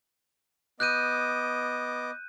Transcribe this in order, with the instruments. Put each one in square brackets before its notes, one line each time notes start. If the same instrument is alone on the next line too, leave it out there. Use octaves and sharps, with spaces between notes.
[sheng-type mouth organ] B3 D#5 D6 [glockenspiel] F#6 G6 D#7